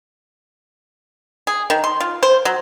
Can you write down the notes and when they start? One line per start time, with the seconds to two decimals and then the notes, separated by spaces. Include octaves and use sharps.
1.47 G#4
1.70 D#3
1.84 C6
2.00 F4
2.23 C5
2.45 F#3